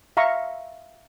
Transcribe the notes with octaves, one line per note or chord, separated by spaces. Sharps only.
E5 F5 A#5 C#6